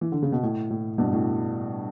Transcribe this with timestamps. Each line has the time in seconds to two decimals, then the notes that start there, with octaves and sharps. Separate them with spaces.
0.01 E3
0.12 D3
0.22 C#3
0.32 B2
0.43 A2
0.71 A2
0.98 G2 B2
1.13 A2